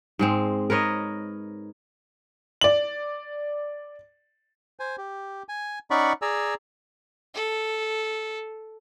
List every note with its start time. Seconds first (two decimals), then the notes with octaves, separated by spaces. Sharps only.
0.19 G#2 G#3 C4
0.70 A#4 B4 C#5 D#5
2.61 D5 F#7
4.80 C5 G#5
4.98 G4
5.49 G#5
5.91 C#4 D#4 D5 F#5 B5 C#6
6.22 G#4 D5 G#5 A#5 E6
7.35 A4